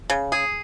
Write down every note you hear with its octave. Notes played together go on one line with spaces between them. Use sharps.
C#3
G#4